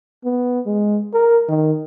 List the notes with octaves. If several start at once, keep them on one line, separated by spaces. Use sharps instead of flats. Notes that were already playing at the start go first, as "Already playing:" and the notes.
B3
G#3
A#4
D#3